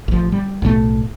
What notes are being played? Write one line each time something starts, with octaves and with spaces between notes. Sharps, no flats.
A1 F3
G3
B1 A2 F#3 A3